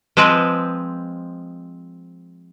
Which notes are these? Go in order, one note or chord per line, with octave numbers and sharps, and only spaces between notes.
F3 G#3 C4 B4